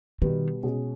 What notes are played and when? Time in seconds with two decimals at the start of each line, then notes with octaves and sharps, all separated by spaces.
0.22 B2 D#3 G3 B3 G4 B4
0.63 B2 G#3 C#4 G#4